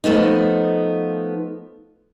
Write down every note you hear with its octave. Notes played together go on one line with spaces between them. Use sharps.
F3 A3 B3 D#4